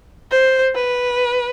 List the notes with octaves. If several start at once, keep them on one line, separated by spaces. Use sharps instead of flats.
C5
B4